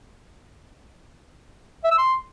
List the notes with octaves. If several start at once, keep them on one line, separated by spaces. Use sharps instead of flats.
E5
E6
C6